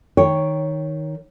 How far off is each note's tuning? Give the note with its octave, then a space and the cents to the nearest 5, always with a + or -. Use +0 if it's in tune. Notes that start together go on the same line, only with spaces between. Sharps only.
D#3 +5 C#5 +0 G5 +0